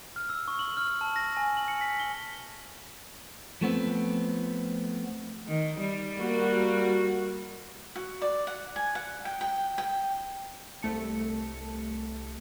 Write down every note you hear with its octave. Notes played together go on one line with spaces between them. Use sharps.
F6
E6
C#6
F#7
F6
A5
A#6
G#5
F#7
C#7
B6
G7
F3 A3 B3 C4
D#3
G3
A#3 F#4
F#4
D5
F#5
G#5
F#5
G5
G5
G5
C2 A3 A5 C#7